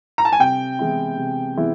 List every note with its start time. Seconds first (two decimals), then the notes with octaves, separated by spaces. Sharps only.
0.18 A#5
0.25 A5
0.32 G#5
0.40 C3 G5
0.79 E3 G#3 B3 E4
1.18 C3
1.57 E3 G#3 B3 E4